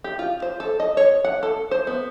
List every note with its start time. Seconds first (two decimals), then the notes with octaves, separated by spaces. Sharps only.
0.04 G4
0.19 F4
0.42 C5
0.60 A4
0.80 D#5
0.97 C#5
1.25 F#5
1.43 A4
1.71 C5
1.87 B3